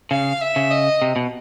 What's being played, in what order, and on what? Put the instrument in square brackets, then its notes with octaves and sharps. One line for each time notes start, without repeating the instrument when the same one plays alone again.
[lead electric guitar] C#3 [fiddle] F5
[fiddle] E5
[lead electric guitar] C#3
[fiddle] D#5
[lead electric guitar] C3
B2